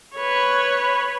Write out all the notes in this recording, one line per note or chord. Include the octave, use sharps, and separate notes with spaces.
B4 C#5